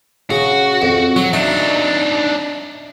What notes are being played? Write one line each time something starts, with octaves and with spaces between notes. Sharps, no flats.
C#3 F#4
F2
F#3 F#4
D4 D#4 E5